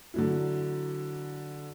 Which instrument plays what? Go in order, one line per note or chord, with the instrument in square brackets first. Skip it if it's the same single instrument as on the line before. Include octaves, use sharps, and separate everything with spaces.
[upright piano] D3 F#3 E4